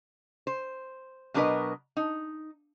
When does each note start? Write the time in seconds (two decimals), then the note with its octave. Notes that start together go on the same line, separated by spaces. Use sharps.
0.47 C5
1.34 B2 F#3 D4 A#4 B4 D#5
1.97 D#4